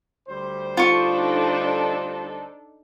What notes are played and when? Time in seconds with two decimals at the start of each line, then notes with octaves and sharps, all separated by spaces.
0.29 D2 G3 C5
0.77 D4 D#4 F4 A4 C#6